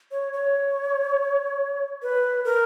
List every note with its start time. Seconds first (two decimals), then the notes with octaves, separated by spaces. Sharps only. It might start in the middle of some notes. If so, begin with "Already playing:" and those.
0.11 C#5
0.33 C#5
2.02 B4
2.45 A#4